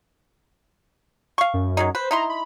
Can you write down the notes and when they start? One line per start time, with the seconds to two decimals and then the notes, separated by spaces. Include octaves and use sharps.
1.38 F5 C#6
1.54 F#2
1.77 F#3 G#3 D#4
1.95 B4 C5
2.11 D#4 E4 A#5 C6
2.30 B5